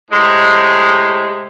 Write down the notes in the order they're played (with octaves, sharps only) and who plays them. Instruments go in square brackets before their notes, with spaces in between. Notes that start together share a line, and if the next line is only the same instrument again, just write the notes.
[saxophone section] A2 C3 G#3